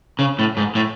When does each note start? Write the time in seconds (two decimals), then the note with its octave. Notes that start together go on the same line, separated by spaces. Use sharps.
0.19 C#3
0.39 A2
0.57 G#2
0.75 A2